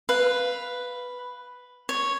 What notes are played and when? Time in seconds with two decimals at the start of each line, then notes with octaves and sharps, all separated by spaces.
0.09 B4 F5
1.89 C#5